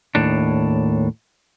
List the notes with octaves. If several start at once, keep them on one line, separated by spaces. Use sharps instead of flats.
D#2 A2 D4